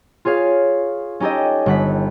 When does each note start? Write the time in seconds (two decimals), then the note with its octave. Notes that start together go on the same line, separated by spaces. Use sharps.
0.25 F4 G#4 C#5 F5
1.20 C#4 D#4 G4 A4 D#5
1.66 G1 F#5 B6